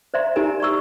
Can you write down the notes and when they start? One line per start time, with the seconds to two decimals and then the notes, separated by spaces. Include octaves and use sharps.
0.14 C5 D5 E5 A#5 C6
0.36 D#4 F4 G4 A#4 G#5 A#5
0.60 D5 A#5 C#6 E6